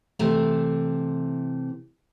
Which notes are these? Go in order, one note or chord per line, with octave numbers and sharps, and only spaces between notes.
C3 E3 A3